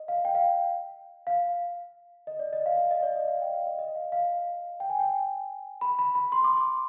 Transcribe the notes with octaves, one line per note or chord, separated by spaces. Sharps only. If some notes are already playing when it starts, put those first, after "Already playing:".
Already playing: D#5
F5
G5
F5
G5
F5
D#5
D5
D#5
F5
F5
D#5
D5
D#5
F5
G5
F5
D#5
D#5
F5
F5
G5
G#5
G5
B5
B5
B5
C6
D6
D6